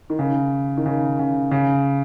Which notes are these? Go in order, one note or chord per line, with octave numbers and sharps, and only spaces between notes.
D#3
C#3
D#3
C#3
C#3
C#3